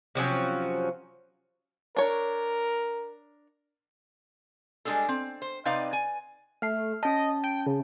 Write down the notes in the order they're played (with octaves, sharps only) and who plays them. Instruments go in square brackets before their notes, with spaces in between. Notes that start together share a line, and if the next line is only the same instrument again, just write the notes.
[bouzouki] C3 F3 F#3 C#4
[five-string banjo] D4 C#5 [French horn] A#4
[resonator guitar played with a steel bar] G3 G#3 C#4 D4 G#4 A4
C4
C5
C3 C4 D#4 B4 D5 F5
G#5
[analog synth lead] A3 [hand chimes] F6 C7
[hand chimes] C#4 A5 [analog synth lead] D#5
[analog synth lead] G5
C#3